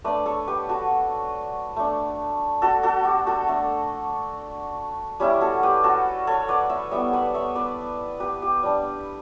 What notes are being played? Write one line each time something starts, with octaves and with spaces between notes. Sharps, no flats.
A3 D4 B4 D5
A4 C#5
G4 B4
F#4 A4
A3 D4
F#4 A4
F#4 A4
G4
F#4 A4
A3 D4
G3 C#4 E4 G4
F#4 A4
G4 B4
F#4 A4
A4 C#5
B4 D5
C#5 E5
G3 B3 E4 C#5 E5
B4 D5
C#5 E5
B4 D5
G4 B4
G4
G3 D4